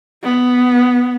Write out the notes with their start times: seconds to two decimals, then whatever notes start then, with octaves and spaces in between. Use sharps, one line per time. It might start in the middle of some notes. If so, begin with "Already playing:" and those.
0.24 B3